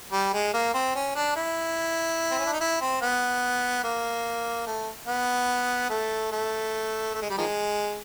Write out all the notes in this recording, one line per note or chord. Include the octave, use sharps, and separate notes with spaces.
G3
G#3
A#3
C4
C#4
D4
E4
C4
C#4
D4
D#4
E4
C4
B3
A#3
A3
B3
A3
A3
A3
G#3
G3
D#3 F3 G#3